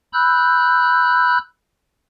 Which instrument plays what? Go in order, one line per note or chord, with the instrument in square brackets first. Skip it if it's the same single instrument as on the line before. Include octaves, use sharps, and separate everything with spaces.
[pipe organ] B5 E6 F#6 G6